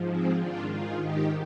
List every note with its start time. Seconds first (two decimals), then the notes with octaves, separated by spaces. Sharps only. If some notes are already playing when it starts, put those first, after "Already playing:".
Already playing: G#2 F3
0.08 G#3 C4
0.39 G#2 D#3 D4 F4
0.70 F4 G#4
1.01 G#2 D#3 D#4 G4